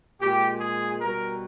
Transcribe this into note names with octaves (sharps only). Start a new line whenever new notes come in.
A#2 G#3 G4
G#4
B2 G3 A#4